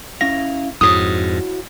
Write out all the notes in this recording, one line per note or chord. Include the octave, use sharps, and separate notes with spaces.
C#4 E4 F5 A#6
F2 G#2 E4 F#4 C#5 D#6